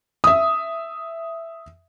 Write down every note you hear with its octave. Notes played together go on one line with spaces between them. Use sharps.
E5 D#6